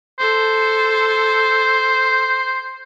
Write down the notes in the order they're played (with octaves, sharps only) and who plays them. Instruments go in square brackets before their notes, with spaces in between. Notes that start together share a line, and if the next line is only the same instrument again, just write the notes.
[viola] A4 [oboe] C5